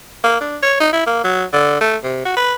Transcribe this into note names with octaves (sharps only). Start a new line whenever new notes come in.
A#3
D4
C#5
D#4
E4
A#3
F#3
D3
A3
C3
F#4
B4